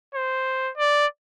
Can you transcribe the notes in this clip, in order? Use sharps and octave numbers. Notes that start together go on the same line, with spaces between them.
C5
D5